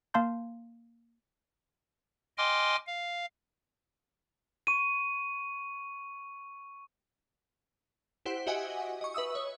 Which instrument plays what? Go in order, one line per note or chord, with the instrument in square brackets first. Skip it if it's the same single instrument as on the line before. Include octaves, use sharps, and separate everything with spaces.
[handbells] A#3 F5 A5 C6 G6
[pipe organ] D#5 G5 G#5 C6 D6 F6
F5
[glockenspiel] C#6 D#7
[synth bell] E4 G4 C5 F#5
F#4 G4 D#5 E5 F#5 G#5
D#5 C#6
B4 E5 D#6 E6
C#5